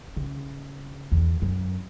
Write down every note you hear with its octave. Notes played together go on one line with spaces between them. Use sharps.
C#3
E2
F#2